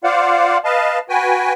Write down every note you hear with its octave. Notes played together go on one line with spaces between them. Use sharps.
F4 C5 D5 F5 F#5
B4 D#5 F5 A5
F#4 B4 G5 G#5